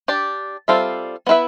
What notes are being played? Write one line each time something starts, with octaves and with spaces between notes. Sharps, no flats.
D4 G4 D5
G3 C4 F4 A4 E5
B3 E4 B4 E5